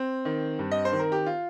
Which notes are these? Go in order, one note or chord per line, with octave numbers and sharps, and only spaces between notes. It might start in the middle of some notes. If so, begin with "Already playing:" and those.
Already playing: C4
D#3
G2
D#5
C5
D#3
A#4
G4
F4